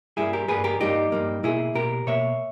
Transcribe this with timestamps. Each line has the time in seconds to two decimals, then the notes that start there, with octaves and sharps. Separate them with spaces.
0.17 G2 G3 A#3 E4 G#4
0.33 G4 A#4
0.48 G2 G3 A#3 G#4 B4
0.64 G4 A#4
0.80 G2 G3 A#3 D#4 G4
1.12 G2 G3 A#3
1.43 B2 A#3 E4 G#4
1.75 B2 A#3 G4 A#4
2.07 B2 A#3 C#5 E5